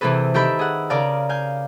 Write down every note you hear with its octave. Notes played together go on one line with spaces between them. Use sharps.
C3 E3 C4 G#4 A4 B4
D#3 G4 A4 E5 B5 G6
G#4 F#5
C#3 A#4 D5 F5 A5
F5 G#5 G6